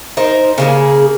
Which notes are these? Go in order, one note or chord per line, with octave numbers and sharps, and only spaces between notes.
D#4 A#4 C5
C#3 A#3 G#4